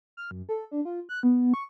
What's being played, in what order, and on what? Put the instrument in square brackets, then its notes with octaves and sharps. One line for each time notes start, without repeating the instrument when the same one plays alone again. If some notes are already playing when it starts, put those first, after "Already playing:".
[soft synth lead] F6
F#2
A4
D4
F4
F#6
B3
C#6